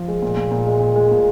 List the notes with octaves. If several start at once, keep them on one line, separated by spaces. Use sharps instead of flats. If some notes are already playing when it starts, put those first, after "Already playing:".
Already playing: F3
G#3
A#2
A#2
A#2
G#3
A#2
G#3
A#2